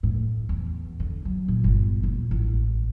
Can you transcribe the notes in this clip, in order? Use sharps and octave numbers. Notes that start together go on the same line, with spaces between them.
A2
E2
D3
F#3
A#2
G1
D#1
A1